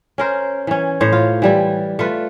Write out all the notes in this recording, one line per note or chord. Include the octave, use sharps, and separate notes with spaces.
C#4 A#4 C5
E3 C#4
A2 C5 C#5
F4
E3 G3 E4
A3 F4 B4